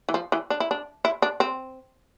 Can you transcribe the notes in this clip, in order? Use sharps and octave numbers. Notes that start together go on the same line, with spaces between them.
E3
F3
E3
D4
E4
D4
E4
D4
C4